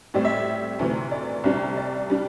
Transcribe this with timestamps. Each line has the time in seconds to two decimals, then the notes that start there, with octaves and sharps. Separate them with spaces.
0.14 A2 G3 C4 D5
0.25 E5
0.79 D2 C3 E3
1.11 D5
1.44 C2 C3 G3 D4
1.77 D5
2.10 G3 D4